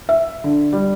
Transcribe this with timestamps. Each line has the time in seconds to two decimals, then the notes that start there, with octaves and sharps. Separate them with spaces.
0.09 E5
0.44 D3
0.73 G3